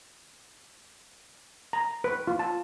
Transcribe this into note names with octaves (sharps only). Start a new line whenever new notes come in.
A#5
B4
F4
A5